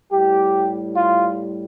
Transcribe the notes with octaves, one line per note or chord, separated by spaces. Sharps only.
A2 G3 G4
F4